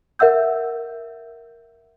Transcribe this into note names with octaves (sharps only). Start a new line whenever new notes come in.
A#4 E5 F#5 E6 G6